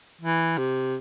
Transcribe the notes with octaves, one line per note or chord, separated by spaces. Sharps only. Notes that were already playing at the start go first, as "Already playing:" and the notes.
E3
C3